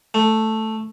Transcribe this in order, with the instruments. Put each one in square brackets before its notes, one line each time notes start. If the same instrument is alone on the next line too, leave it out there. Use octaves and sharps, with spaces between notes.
[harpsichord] A3